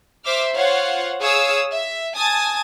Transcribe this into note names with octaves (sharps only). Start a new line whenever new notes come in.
C5 E5 D6 F6
F4 C5 C#5 F5 F#5
G#4 C#5 F5 D#6 E6
E5
G#5 A5 D#6 A6